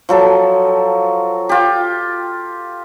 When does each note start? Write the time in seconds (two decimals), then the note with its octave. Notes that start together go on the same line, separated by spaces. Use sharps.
0.09 F3 F#3 A4
1.49 F4 G4